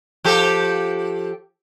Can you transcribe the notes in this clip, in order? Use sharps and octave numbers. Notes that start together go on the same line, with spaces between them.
F3 G4 A4